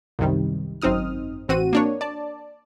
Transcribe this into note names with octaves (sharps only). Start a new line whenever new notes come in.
C2 F#2 C3 D#3 G3
G#1 F#2 C4 D#4 D#6 F6
A1 E3 C4 F#4 D#7
A#3 D4 C#5
D5 A5